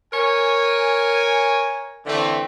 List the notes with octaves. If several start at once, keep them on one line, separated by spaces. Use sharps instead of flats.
A#4 C#5 G#5
D3 E3 A3 C4